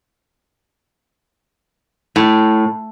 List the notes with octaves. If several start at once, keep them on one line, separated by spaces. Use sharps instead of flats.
A2